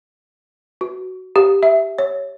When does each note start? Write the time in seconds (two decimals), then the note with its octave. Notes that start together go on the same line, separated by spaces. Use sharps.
0.81 F#4
1.36 G4
1.63 E5
1.99 C#5